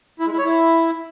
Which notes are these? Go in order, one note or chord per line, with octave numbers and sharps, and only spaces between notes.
E4
G#3
E4
C#5
E4